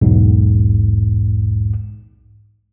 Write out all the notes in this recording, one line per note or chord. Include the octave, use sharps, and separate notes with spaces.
B1 E2 G#2